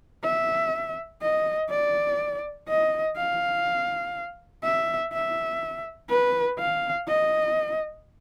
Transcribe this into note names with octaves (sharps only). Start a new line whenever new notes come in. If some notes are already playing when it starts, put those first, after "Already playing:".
E5
D#5
D5
D#5
F5
E5
E5
B4
F5
D#5